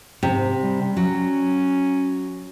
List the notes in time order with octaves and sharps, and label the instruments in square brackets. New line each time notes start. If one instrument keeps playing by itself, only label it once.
[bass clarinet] G#2 [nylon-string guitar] C3
[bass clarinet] G3
[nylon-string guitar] F#3 [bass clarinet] C#4